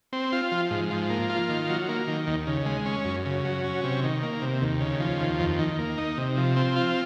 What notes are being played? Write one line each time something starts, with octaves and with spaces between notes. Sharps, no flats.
C4
F4
F3
G#2
F3
A#3
F4
D#3
F#3
A#3
D#3
D#2
C#3
G#3
C#4
F#2
C#3
F#3
C#4
C3
D#3
A#3
C3
D#2
C#3
F3
D#2
F2
D#3
A#3
D#4
C3
F3
C4
F4